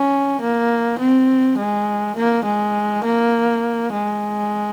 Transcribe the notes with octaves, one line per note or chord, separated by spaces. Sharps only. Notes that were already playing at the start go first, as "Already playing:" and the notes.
Already playing: C#4
A#3
C4
G#3
A#3
G#3
A#3
G#3